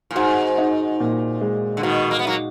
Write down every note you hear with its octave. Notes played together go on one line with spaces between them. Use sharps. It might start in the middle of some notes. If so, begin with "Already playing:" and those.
A#2
G#2 F#4
D#4
A#2
G#3
D3
B2 D#3 F#4
A#3
B3
F#3 A#3 D#4